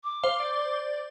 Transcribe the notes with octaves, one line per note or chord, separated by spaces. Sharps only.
D6
C5 F5
D5